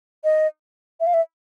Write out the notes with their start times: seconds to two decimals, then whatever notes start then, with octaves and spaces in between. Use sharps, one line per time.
0.24 D#5
1.00 E5
1.07 F5
1.14 E5